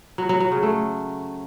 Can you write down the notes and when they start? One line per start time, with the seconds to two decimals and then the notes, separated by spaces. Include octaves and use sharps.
0.18 F#3
0.29 F#3
0.40 F#3
0.52 C#3
0.63 A3